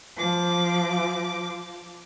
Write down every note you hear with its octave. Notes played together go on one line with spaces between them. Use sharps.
F3 D6